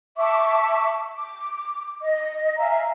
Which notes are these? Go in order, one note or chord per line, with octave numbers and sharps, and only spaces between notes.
E5 A5 C#6 D6
D6
D#5
E5 F5 G#5 A#5